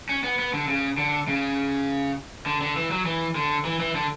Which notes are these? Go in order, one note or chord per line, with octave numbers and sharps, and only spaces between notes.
C#4
B3
B3
D3
C#3
D3
C#3
D3
D3
E3
F#3
E3
D3
E3
E3
D3